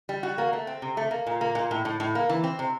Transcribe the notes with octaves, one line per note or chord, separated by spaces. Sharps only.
G3
F#4
A#3
A3
C4
C3
A3
A#3
A#2
A#3
A#2
A2
A2
A2
A#3
E3
C4
C3